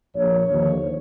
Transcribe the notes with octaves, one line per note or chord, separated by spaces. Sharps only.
A#1 A#2 F3 C#5
D#2 D3 F3